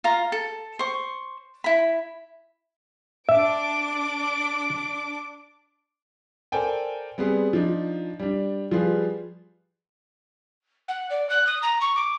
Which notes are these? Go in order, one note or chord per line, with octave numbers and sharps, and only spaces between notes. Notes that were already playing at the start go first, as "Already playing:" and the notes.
F4 F5 A#5
A4
C5 C#6
E4 B5
D4 E5 D6 D7
A4 A#4 C5 D5 G5 G#5
G3 B3 C4 G#4
F3 D4 D#4
G3 D4
F3 G3 F4 G#4 B4
F#5
D5
F#6
D#6
A#5
C#6
D6